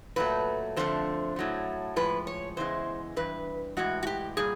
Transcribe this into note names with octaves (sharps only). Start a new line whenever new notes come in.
A#2 F#3 A3 B4
F2 D3 F3 A3 C5
A2 F#3 A3
A2 F3 G#3 B4
C#5
E2 C#3 E3 G#3 C5
G2 E3 B4
A2 E3 G#3 F#4
F#4
G4
A#2 G3 G#4